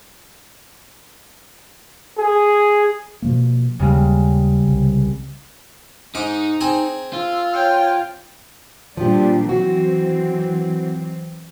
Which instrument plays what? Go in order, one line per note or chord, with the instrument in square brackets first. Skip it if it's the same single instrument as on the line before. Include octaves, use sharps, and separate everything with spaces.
[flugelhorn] G#4
[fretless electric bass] B2 F3 A#3
[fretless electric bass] D#2 [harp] C#3 G3 G#3
[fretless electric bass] C2
[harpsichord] G#2 D6 [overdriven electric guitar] D#4
[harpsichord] C4 G#4 G#5
[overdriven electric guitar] F4 [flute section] E6
[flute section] C#5 [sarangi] G5
[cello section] A#2 G3 D4 [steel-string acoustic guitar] F3 G4
[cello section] E3 F#3 C4 [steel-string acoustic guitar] F#4